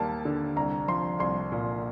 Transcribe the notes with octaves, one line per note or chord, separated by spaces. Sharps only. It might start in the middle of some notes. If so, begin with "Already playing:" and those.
Already playing: D#2 G3 A#3 A5
D3
C2 A#5
F3 C6
C2 C6
A#2